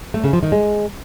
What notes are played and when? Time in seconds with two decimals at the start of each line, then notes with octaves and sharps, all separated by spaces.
0.14 A3
0.24 C#3
0.33 F3
0.43 D#3
0.52 G#3